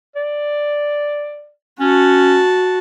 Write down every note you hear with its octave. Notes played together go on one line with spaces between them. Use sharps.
D5
C#4 F#4 A5